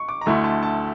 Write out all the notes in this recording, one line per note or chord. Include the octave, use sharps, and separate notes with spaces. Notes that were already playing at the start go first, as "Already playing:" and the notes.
Already playing: C#6
D6
A#5
D2 D3 A3 E4 C#6
A5
A5